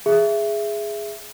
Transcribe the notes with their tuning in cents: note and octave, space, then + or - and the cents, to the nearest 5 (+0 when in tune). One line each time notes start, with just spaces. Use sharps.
G#4 +0 E5 +15